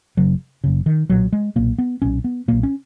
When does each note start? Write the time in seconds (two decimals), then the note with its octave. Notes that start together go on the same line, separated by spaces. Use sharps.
0.17 F#1 F#2 C#3 F#3
0.64 F#1 F#2 C#3
0.86 D#3
1.10 B1 A#2 F#3
1.33 G#3
1.56 B1 A#2 A#3
1.78 B3
2.02 B1 A#2 C#4
2.24 B3
2.48 B1 A#2 A#3
2.63 C#4